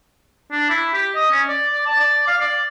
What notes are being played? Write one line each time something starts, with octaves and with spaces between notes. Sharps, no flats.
D4
E4
G4
D#5
C#4
D5
D5
A5
D5
F5
D5